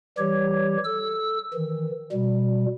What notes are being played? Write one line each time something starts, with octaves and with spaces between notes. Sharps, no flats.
E3 G3 G4 C#5
A4 E6
D#3 E3
B2 G3